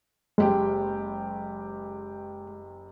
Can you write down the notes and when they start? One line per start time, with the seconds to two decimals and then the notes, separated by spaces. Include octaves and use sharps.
0.38 F#1 G#3 G4 G5